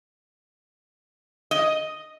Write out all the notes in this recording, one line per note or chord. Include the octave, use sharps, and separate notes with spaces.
D#5